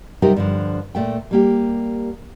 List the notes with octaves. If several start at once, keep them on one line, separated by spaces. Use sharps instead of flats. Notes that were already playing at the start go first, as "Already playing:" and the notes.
C3 F#3 G3 D#4 G4 A#4
G2 D3 F3
A#2 A3 G5
G3 A#3 G4